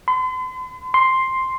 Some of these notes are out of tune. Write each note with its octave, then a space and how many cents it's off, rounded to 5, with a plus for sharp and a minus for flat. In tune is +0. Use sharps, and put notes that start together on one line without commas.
C6 -45
C6 +5